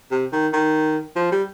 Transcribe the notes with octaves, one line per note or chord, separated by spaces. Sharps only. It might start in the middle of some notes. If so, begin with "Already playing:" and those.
C3
D#3
D#3
F3
G3